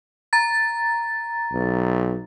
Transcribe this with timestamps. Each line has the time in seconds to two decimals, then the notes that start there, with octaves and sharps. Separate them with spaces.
0.33 A#5 A6
1.53 B1